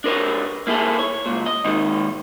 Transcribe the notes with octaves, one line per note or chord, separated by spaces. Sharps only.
D4 A#4 B4 C#5
A#3 E4 G#4 A4
C#5
C#2 A#2
D#5
D#2 G#2 D#3 D#4